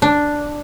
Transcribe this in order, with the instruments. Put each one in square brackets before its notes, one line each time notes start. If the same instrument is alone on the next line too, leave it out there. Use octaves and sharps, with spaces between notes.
[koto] D4